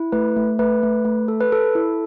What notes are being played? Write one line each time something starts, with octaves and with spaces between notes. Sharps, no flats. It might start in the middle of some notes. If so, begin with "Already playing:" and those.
Already playing: E4
A3 B4
A3
A3 B4
A3
A3
A4
B4
A4
E4